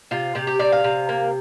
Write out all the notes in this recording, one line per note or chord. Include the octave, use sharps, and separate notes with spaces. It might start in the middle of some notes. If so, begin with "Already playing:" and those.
C3 F4
C3 G4
G4
C3 D5
F5
C3
A#3